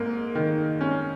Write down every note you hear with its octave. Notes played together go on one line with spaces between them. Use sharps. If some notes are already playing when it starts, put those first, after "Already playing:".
Already playing: G#2 A#3
D#3
C#4